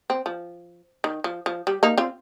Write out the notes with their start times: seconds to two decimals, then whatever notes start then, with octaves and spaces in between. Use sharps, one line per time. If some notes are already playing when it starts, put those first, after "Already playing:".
0.10 C4
0.26 F3
1.04 D#3
1.24 F3
1.46 F3
1.67 G3
1.83 A#3 D#4
1.98 C4 F4